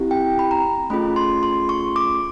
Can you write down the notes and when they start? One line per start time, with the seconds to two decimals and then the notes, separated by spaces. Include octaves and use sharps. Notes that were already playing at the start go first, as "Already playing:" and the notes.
Already playing: C4 E4 G4
0.11 G5
0.39 B5
0.51 A#5
0.90 A3 C#4 F4 G#4 B5
1.16 C6
1.43 C6
1.69 C#6
1.96 D6